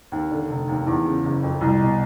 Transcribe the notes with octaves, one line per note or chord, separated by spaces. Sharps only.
D#2
D3
F1
D#2
E2
C#3
F#1
F2
C2
B2